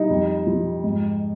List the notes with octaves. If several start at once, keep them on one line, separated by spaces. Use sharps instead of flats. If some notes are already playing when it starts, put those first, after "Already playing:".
Already playing: G3 D#4
F2
F3
G#2